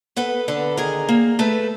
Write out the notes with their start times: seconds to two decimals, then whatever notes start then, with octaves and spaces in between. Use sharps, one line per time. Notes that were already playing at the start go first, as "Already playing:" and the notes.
0.16 B3 A4 B4
0.48 D3 A4 B4
0.77 D#3 G#4 A#4
1.09 A#3
1.39 A3 A4 B4